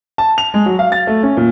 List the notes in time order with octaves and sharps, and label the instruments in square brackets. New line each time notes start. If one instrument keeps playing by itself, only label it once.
[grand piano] A5
F7
G#3
F#3
F5
A6
A3
C#4
A#2